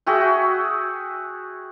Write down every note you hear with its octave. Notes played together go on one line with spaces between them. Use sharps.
F#4 G#4 E5 G5